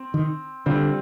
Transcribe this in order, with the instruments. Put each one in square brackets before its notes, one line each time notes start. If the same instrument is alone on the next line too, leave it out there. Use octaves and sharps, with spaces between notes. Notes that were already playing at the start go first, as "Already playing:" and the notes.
Already playing: [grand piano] C4
[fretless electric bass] D#3
[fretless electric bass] D3 [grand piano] G3 C4 F4